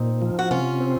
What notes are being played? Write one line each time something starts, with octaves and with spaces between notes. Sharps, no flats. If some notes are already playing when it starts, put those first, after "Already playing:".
Already playing: A#2 C4 D#4
F3
F#4
C3 C#4 F4
C4